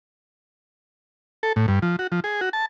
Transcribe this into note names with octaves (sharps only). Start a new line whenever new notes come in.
A4
A2
G2
F3
F#4
F3
G#4
F#4
A5